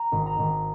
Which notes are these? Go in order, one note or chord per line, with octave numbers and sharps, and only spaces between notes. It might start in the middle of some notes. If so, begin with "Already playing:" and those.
Already playing: A#5
G#1
A#5
G#1